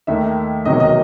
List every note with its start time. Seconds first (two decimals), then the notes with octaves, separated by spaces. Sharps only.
0.07 D#2 D#3 A3 E5
0.65 E1 E2 C3 D#3 F#3 D#5
0.80 D#5